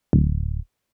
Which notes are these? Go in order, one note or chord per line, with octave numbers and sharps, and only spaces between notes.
D1